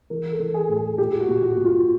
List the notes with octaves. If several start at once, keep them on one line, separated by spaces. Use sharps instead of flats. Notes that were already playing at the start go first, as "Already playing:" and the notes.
E3 A#4
A4
E3
G#4
A2
G#4
A#2 G4
F#4
A#2
F#4
A#2
F4